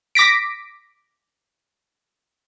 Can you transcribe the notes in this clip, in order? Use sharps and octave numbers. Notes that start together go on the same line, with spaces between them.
D6 A#6 B6 D7